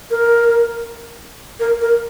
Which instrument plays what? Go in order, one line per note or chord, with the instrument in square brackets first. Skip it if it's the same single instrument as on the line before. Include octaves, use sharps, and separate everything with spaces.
[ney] A#4
A#4
A#4